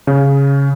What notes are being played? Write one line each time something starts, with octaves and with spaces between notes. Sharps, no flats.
C#3